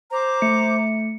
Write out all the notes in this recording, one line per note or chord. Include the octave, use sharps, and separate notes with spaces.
C5 A#5 D6
A3 C#7